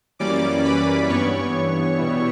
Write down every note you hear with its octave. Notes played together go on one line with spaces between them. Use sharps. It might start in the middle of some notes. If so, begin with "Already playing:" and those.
F#2 E3 G3 A#3 C#4 D5 D6
B4 B5
G2 E3 B3 C#5 C#6
B2 G3 B3 E4